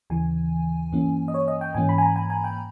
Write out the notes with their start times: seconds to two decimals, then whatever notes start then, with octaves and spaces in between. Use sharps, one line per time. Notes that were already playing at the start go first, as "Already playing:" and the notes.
0.10 D#2 C#3 E3 G#5
0.92 G2 E3 A#3 C#4
1.28 D#5
1.34 C#5
1.48 D#5
1.61 G5
1.74 G#2 E3 A#3 C#4 G#5
1.89 B5
1.98 G#5
2.02 A#5
2.16 G#5
2.30 G#5
2.44 G5